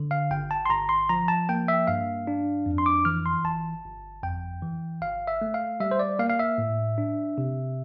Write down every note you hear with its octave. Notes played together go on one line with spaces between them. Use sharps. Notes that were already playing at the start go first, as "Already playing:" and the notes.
Already playing: D3
F5
G1 G5
A5
C6
G1 A#5
C6
F3 A#5
A5
A#3 G5
E5
G2 F5
D4
F2
C6
D6
E3 F6
C6
G1 A5
G1
F2 G5
E3
G1 F5
E5
A3
F5
G3 E5
C5
D5
A#3 F5
F5
E5
A2
D4
C3